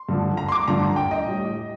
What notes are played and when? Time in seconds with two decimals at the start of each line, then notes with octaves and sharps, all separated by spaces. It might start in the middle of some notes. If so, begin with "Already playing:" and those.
Already playing: C6
0.09 G2 D3 F3
0.37 A#5
0.49 C6
0.52 D6
0.68 G2 D3 F3 A#5
0.96 G5
1.11 D#5
1.26 A2 G3